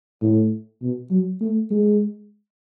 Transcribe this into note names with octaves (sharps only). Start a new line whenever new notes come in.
A2
B2
F#3
A3
G#3